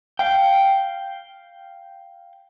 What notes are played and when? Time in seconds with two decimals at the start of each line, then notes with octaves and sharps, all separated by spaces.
0.19 F5 G5